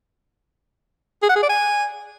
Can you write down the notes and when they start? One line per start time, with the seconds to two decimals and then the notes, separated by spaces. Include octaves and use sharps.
1.22 G#4
1.29 F#5
1.36 G#4
1.43 D5
1.49 G#5